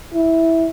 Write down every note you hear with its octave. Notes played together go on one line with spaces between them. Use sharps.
E4